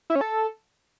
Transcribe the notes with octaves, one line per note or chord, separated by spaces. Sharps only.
E4
C#4
A4